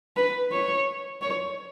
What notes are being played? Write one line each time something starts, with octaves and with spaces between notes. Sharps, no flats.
B4
C#5
C#5